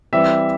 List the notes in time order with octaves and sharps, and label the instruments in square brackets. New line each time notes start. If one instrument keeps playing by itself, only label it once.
[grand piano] E3 G3 C4 E5